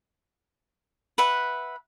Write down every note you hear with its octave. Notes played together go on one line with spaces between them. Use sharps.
B4 E5 F#5